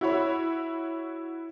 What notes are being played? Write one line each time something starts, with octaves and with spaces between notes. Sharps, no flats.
E4 F#4 C#5 B5